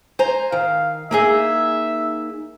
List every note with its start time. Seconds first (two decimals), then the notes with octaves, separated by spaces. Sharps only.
0.19 C5 G#5 A#5
0.52 D#3 F5
1.11 A#3 D#4 G#4 E5